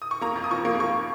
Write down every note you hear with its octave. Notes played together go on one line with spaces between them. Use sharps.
D#6
C#6
A#3 A#5
F2
D#6
F3 C#6
A#3
A#3 C#6